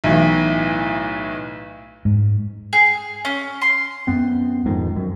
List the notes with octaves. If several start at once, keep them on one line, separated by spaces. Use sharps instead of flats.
B1 A2 E3
G#2
G#4
C#4
C6
F#2 B3 C4
D#1 F2 G#2 D#3
F#2